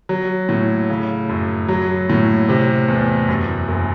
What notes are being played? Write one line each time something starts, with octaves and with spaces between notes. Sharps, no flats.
F#3
A2
C#3
F#2
F#3
A2
C3
E2
F#2
F#1